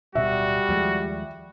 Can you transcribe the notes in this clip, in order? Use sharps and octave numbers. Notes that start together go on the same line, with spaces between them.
D1 B2 G3 F#4 E5
D#2 F3 G#3